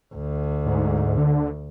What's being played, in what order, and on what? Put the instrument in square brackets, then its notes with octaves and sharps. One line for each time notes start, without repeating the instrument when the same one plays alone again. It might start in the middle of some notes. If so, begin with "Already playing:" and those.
[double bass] D2
[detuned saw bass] G#2
D3